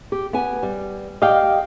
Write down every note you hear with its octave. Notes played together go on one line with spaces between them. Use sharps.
G4
B3 F#5 G#5
G3
G4 D5 D#5 F5 G5